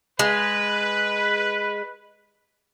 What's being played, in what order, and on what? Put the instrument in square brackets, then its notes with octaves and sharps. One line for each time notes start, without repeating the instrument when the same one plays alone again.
[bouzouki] G#3 [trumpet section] B4